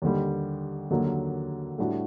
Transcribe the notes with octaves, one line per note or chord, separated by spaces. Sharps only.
D#2 D3 G3
D#2 D3 F#3 A#3
A2 G3 D4 F#4